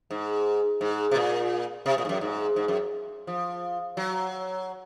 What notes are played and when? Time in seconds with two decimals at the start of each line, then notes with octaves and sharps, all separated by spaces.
0.11 G#2
0.81 G#2
1.11 C3
1.16 A#2
1.86 C3
1.98 A#2
2.05 G#2
2.09 F#2
2.21 G#2
2.56 G#2
2.68 F#2
3.27 F3
3.97 F#3